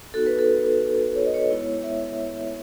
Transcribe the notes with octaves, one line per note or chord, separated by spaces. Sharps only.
B3 D#4 F#4 A4
B4
A4
C#5
D#5
C#5
G#3 B3 E4
E5